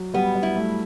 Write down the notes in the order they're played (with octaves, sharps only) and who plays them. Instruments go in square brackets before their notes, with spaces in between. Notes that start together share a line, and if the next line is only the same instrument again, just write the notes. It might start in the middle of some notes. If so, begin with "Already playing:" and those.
Already playing: [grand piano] F#3
[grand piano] G3 [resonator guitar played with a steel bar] B3
[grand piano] G3
[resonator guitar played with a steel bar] E4
[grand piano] A3